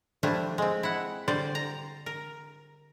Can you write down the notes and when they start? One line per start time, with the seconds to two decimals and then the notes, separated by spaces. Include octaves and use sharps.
0.23 F3 G3 A3 D4 E4
0.58 G#3 C4
0.83 E4 F#5
1.28 D3 G3 C5 D5
1.55 A#5
2.06 A#4